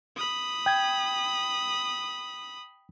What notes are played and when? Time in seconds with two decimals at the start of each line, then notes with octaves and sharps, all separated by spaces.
0.16 B5 D#6
0.66 G5 G#6